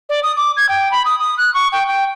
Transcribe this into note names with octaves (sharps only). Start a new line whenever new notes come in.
D5
D#6
D6
G#6
G5
B5
D#6
D#6
F#6
C#6
G5
G5